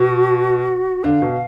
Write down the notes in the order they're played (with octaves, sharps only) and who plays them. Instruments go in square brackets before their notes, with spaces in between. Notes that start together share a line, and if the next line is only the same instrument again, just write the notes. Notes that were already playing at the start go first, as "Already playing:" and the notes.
Already playing: [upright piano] B2 [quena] F#4
[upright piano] D3 [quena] F5
[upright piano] B2